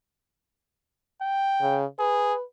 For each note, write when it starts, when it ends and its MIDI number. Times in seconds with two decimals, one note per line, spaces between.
1.22 1.79 79
1.61 1.85 49
1.99 2.34 68
1.99 2.43 71